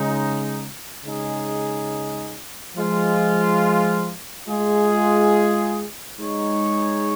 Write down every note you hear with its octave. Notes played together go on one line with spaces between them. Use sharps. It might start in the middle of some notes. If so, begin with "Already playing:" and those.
Already playing: C#3 G#3 D#4
C#3 G#3 D#4 G#4
F3 G#3 F4
G#3 F4 G#4
G#3 D#4 C#5